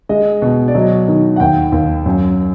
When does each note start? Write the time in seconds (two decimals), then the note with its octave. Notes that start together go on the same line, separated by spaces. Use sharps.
0.09 G#3 D#5
0.42 B2
0.68 D5
0.74 F#3 D#5
1.08 D#3
1.36 F#5
1.40 D#2 G5
1.72 D#2
2.06 F#2